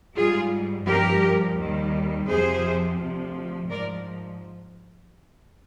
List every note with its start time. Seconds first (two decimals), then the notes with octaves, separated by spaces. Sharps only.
0.16 G#2 G3 F4 G#4
0.87 G2 F3 G4 A#4
1.57 D#2 D#3 G3
2.28 F2 C3 F3 G#4 C5
3.00 D2 C3 F3
3.70 G#2 F3 A#4 D5